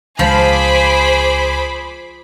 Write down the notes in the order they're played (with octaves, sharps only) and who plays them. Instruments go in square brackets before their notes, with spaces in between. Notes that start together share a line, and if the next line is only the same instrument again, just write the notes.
[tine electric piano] C#2 [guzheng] F3 [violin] G#4 C5 [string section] B5 D6